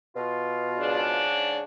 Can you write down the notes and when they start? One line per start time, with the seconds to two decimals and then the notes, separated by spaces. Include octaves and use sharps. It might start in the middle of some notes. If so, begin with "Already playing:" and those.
0.16 B2 F4
0.78 G#2 C#3 D4